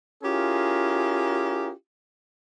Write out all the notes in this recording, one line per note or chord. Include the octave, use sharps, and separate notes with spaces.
C#4 E4 F4 G4 G#4 A#4